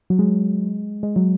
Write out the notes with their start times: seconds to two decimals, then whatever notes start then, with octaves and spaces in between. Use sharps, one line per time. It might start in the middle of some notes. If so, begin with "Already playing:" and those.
0.10 F#3
0.19 G#3
1.03 G#3
1.16 F#3